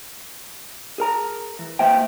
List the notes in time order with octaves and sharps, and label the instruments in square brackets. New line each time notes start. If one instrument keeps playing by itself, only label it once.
[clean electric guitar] G#4 A#4 A#5
E3
A#3 C5 E5 G5